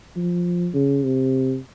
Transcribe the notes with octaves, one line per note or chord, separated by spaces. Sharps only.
F3
C#3
C3